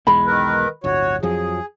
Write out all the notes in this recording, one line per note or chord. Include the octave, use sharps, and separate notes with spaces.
B1 E2 G#3 B5
D#3 A#4 B4
D1 G1 F#4 C#5
F2 F3 F#3 G#4